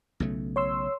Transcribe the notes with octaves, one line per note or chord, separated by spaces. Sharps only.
B1 C#3 A3
C#5 C6 E6